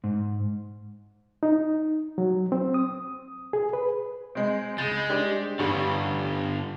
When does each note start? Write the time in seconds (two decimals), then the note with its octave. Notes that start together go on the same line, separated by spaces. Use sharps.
0.04 G#2
1.43 D#4
2.18 F#3
2.52 C4
2.74 D#6
3.53 G#4
3.73 B4
4.35 G#3 C4
4.78 C#2 G#3 G6 A6
5.10 D4 G4 C5
5.59 A1 G2 D3 G3 C#6